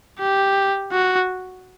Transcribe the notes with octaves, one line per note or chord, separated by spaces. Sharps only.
G4
F#4